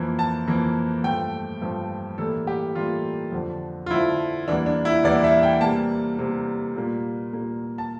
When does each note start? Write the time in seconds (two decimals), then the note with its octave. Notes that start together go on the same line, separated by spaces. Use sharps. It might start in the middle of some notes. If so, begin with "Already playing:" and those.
Already playing: F2 E3 A#3
0.19 A5
0.48 F2 E3 A#3
1.04 G2 F3 A3 G5
1.62 G2 F3 A3
2.18 A2 E3 G3 A#3 A4
2.47 G4
2.75 A2 E3 G3 A#3 F4
3.32 F2 D3 F3
3.86 F4
3.90 F2 D3 F3 E4
4.48 E2 E3 G3 A#3 D4
4.66 D4
4.85 E4
5.04 E2 E3 G3 A#3 D5
5.24 E5
5.43 G5
5.61 C3 G3 A#3 A5
6.19 C3 G3 A#3
6.76 A#2 G3 A#3
7.33 A#2 G3 A#3
7.78 A5